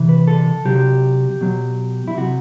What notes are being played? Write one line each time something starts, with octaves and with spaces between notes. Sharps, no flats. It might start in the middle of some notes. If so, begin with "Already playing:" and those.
Already playing: C3 E3
B4
A4
C3 F#3 G4
B2 F#3
E4
C3 F#3 F#4